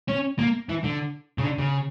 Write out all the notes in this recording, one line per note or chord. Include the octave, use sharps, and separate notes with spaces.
C#4
A#3
E3
D3
C#3
D3
C#3